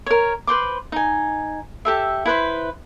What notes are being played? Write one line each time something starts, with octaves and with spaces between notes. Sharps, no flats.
A#4 C#5
B4 C5 C6 D6
D#4 G#5
G4 A4 E5
E4 B4 C5